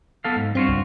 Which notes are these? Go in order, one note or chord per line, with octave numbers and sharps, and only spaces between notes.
B3 A4 F5
G#2
G2 C4 F4 F#4
C#2